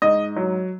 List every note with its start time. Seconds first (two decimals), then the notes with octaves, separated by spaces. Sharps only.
0.02 G#2 D#5
0.36 F#3